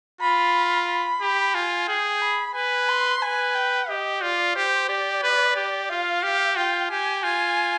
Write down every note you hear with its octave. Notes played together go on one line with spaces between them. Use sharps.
F4 B5
B5
G4
F4 G#5
G#4 G5
B5
B4 G#5
C6
B4 G#5
G5
G4 D#5
F4 D5
G4 C5
G4 D5
B4
G4
F4 F5
G4
F4 G5
G4 G#5
F4 G#5